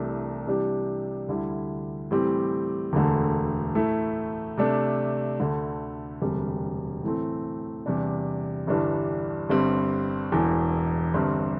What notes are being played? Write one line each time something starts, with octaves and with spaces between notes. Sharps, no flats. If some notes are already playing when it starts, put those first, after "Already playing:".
Already playing: C2 C3 E3 A3 D4
C3 E3 G3 D4 G4
D2 D3 G3 E4
A2 E3 G3 C4 G4
E1 D2 D3 A3
A2 A3 E4
C3 A3 D4
D2 D3 A3
E1 D2 C3 G3
A2 E3 A3 C4
E2 C3 G3 D4
G1 G2 E3 G3 D4
G1 G2 G3 C4
E1 E2 E3
G1 G2 G3 C4